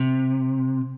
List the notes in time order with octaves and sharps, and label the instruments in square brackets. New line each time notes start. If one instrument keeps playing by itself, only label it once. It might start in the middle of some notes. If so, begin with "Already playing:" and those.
Already playing: [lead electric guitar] C3